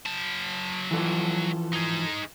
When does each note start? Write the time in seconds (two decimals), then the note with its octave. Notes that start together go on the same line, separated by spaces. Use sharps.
0.06 F#3 A5
0.91 E3 F3 A4
1.73 D#4 G#4